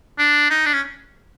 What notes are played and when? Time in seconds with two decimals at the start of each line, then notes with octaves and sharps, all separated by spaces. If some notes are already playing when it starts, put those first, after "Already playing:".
0.18 D4
0.50 D#4
0.66 D4
0.74 C#4